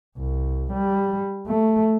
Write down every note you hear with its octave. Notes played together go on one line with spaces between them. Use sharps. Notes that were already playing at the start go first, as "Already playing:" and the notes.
C2
G3
A3